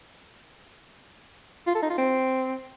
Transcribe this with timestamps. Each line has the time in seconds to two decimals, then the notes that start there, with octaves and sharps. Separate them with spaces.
1.67 F4
1.75 A4
1.83 D#4
1.90 F4
1.98 C4